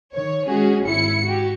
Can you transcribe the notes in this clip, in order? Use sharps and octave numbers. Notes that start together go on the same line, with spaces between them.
D#3 C#5
G#3 C#4 F#4 G#4
G#1 E4 C#7
F#4 G4